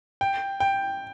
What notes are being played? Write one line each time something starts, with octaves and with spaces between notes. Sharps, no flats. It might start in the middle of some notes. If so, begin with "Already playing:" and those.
G5
G5